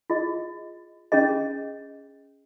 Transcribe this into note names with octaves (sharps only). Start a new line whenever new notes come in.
F4 G#4 D#5
C#4 G#4 D#5